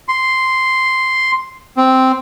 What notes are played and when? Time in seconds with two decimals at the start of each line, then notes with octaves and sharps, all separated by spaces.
0.08 C6
1.77 C4